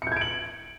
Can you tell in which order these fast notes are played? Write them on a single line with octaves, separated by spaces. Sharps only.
C#7 G6 G#6 D7 F#7